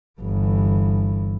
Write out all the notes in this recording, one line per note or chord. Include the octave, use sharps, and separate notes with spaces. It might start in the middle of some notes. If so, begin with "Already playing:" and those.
G1 E3